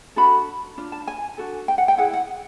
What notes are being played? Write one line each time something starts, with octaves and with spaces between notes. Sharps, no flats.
D4 F#4 A4 B5
D4 F4
A5
G#5
D4 F#4 A4
G5
F#5
G5
E4 G#4 B4 F#5
F#5